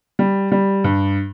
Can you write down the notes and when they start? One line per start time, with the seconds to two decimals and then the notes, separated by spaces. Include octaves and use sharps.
0.19 G3
0.52 G3
0.84 G2